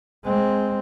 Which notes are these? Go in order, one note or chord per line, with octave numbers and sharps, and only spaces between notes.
G#3 C4